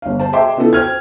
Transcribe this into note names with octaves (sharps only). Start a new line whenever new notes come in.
G1 F5
C5 A5
G#4 D#5 E5 G5 C6 D6
C#3 B3 E4 F4 A4
C5 G5 F6 G#6